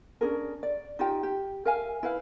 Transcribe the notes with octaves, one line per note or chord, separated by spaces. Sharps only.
C#4 D4 G#4 A#4
D5
D#4 F4 G4 G5
G4
A#4 E5 F5 G#5
E4 B4 F5